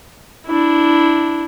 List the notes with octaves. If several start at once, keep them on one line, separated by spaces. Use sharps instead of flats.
D4 E4